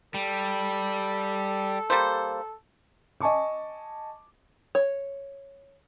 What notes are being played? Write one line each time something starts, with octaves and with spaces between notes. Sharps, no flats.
G3 A4
G3 A#3 C5
D#5 G#5 A5 C#6 D6
C#5